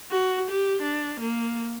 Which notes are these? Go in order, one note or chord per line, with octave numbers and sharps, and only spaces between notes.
F#4
G4
D4
A#3